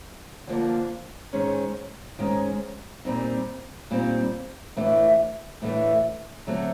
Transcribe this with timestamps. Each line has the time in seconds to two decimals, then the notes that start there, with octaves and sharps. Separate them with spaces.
0.47 D3 F3 A#3 D4
1.33 G#2 D#3 G#3 C#4
2.19 G#2 D#3 G#3 C#4
3.05 A#2 G3 C4 D#4
3.91 A#2 G3 C4 D#4
4.77 A2 E3 A3 D4
5.62 A2 E3 A3 D4
6.47 D3 F#3 A3 C4